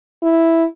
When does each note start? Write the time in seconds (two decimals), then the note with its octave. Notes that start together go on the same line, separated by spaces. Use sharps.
0.23 E4